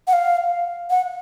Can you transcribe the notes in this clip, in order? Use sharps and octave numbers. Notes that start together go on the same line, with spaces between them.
F#5
F5
F#5